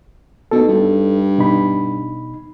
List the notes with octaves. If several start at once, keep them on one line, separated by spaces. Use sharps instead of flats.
B2 D#4 A4
G2
B2 D#4 B5